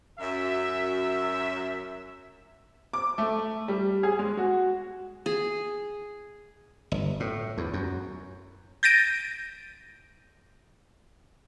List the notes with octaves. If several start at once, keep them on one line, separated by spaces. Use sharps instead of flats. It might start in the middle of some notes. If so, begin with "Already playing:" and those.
F#2 E5
D6
A3
G3
G#4
G#3
F#4
G#4
G1
A2
E2
F#2
G6 A6 A#6 D7 D#7